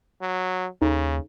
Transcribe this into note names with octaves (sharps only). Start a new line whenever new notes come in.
F#3
D#2 C#3 D#4 A4